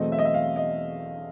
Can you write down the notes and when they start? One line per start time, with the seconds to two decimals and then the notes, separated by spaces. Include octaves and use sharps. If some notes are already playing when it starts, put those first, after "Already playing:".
Already playing: E2 B2 F#3 A3 C4 D#5
0.12 E5
0.19 D#5
0.25 E5
0.34 F5
0.56 D#5